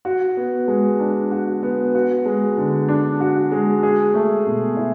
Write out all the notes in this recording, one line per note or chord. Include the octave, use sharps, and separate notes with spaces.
F#4
B3
G#3
D4
F#4
B3
F#4
G#3
D3
D4
F#4
G#3
G#4
A3
B2
E4